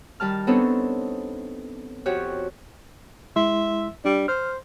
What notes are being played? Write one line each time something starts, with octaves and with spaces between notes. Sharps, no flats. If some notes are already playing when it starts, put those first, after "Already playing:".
D#3 G3 A5 F6
B3 C4 D4 D#4 A4 C#5
F2 F#4 G4 C#5 F#6
G#3 E4 E5 C6
G3 D4
C5 F6